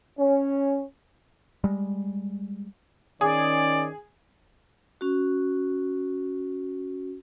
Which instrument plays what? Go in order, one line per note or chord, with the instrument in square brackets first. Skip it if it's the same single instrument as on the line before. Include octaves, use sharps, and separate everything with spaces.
[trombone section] C#4
[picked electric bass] G3 G#3
[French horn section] D#3 C#4 [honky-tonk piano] G#4 [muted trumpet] D5
[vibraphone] C#4 F#4